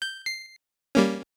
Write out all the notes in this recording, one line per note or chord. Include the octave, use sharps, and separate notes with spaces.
G6
C7
G3 A#3 C#4